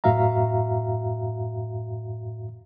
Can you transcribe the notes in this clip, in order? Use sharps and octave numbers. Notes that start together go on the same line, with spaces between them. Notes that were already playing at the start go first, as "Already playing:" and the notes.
F#2 A2 F#4 E5 F5 A#5